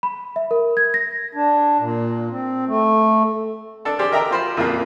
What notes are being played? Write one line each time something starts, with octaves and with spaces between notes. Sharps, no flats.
B5
E5
A#4
G#6
A#6
D4
A#2
C4
A3
D4 A4 A5
G4 G#4 C5 D5
A#4 D#5 E5 G5 A#5
F4 C5 B5
F2 A#2 C#3 F3 A#3